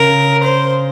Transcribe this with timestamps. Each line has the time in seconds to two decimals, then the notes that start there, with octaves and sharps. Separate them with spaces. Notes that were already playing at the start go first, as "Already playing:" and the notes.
Already playing: C#3 A#4
0.43 C5